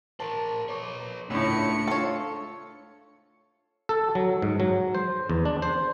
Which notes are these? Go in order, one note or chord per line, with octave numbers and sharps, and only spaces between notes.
A#4 C5 A5
B4 C#5
C#2 A2 A3 D4 C#7
F4 A4 C#5
A4
F#3
G#2
F#3
C5
E2
D4
C5